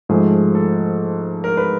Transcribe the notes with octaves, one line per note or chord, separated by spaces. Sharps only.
G#2 F3 A3 G#4
A4
A#4
B4